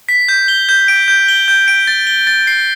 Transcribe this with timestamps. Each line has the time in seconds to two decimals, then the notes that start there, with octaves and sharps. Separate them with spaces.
0.09 B6
0.29 G6
0.48 G7
0.69 G6
0.88 D7
1.08 G6
1.28 G7
1.48 G6
1.68 D7
1.87 A6
2.07 G7
2.27 A6
2.47 C7